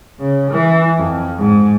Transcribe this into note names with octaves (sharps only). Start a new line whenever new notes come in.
C#3
E3
F2
G#2